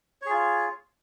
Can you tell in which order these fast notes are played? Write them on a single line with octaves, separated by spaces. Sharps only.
C#5 G#4 F4